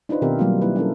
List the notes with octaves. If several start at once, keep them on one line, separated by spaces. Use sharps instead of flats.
D4 D#4 F4 B4 C5
B2 D#3 C4 G4 A#4 E5
F#3 G3 A#3 F4
A#3 E4 B4
C#4 E4 A4 A#4